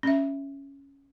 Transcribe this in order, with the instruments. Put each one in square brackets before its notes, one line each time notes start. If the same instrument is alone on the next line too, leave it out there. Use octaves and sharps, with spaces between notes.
[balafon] C#4 E5